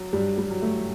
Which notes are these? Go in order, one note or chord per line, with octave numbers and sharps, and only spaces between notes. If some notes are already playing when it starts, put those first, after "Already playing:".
Already playing: F#3
G2 G3
G3
F#3
A3